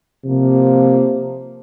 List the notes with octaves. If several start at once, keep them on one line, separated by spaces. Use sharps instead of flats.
C3 F3 A#3